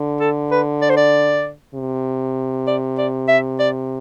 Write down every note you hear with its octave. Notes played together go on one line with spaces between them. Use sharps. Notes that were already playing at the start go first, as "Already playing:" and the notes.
Already playing: D3
A4
B4
D5
C5
D5
C3
D5
D5
E5
D5